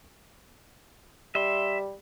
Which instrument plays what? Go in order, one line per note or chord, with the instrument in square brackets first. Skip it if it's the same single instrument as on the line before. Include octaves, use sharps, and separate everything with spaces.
[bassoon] G3 [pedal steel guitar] E5 C6